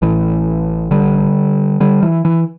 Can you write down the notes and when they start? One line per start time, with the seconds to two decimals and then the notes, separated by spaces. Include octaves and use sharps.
0.02 A1 A2 E3
0.91 D3 G3
1.80 D3 G3
2.03 E3
2.25 E3